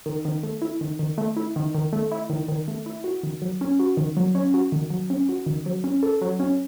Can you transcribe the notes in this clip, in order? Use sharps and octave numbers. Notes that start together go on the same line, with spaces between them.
D#3
D#3
A3
E4
D#3
D#3
A3
E4
D#3
D#3
A3
E4
D#3
D#3
A3
E4
F#4
D#3
F#3
C#4
F#4
D#3
F#3
C#4
F#4
D#3
F#3
C#4
F#4
D#3
F#3
C#4
A4
F#3
C#4